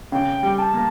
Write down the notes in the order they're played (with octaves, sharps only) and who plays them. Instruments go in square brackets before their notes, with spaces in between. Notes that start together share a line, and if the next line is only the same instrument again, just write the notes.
[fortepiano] C#3 [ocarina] G5
[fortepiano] G3
[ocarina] A5
[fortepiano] A#3